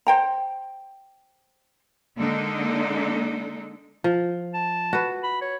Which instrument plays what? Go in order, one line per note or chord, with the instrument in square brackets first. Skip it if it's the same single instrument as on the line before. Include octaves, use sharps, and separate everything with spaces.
[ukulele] C5 G5 A#5
[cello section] D3 G#3 A#3 D4 D#4 A4
[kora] F3
[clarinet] A5
[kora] F#4 B4
[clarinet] B5
C#5